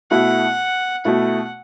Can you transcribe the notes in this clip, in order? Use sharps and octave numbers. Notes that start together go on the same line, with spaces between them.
B2 A3 E4 F#5
B2 A3 E4 F#5